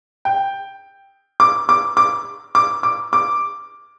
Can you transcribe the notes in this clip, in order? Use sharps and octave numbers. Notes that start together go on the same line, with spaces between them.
G5
D6
D6
D6
D6
D6
D6